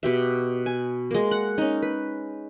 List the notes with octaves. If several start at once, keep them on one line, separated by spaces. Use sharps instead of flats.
B2 G4 E5
G#5
G#3 A#3
F#5
C#4 D#4
B4